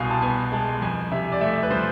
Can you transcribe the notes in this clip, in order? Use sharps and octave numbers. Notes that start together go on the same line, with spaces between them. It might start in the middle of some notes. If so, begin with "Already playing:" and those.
Already playing: C2 B2 F5 G#5
A5
B3 G#5
G#3 A5
F2 G#5
C3 E5
D5
A3 E5
B4
F3 C5